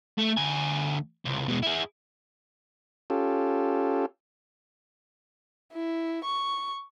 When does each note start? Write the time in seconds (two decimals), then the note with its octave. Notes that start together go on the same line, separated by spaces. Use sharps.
0.18 A3
0.37 D2 G#5
1.25 C#2 C3
1.48 B2 G#3
1.63 E4 G#4
3.10 C#4 F4 G4 A4
5.72 E4
6.24 C#6